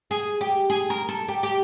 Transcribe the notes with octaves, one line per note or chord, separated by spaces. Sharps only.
G#4
G4
G#4
A#4
A4
G4
G4